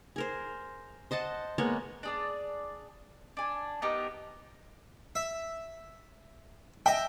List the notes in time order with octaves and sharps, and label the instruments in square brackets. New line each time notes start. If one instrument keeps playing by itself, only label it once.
[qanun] G#4 A#4 C5
C5 D#5 F#5 A5
G#3 A#3 B3 C#5
[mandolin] D4 G#4 D5
D4 G#5
B3 D#4 G4 A#4
[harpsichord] E5
[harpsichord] D#5 E5 [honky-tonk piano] G5